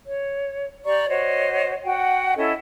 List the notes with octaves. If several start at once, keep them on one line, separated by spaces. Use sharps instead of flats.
C#5
G4 D5 A#5 C#6
F#4 C5 C#5 D#5
F#4 F#5 G5
C#4 E4 A4 D#5